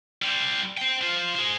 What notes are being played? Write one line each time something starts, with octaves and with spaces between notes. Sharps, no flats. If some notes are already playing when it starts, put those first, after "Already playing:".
G3 C4
C5 G5
F4 C5
G#4 C5